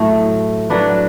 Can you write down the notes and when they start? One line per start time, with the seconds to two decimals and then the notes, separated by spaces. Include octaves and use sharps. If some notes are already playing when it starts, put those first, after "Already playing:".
Already playing: A2 F#3 A3
0.70 F#3 D4 B4